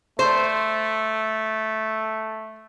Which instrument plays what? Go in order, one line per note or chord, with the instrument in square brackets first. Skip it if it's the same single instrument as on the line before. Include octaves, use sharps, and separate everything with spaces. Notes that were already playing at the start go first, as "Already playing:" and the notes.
[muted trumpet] A3 [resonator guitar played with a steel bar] C5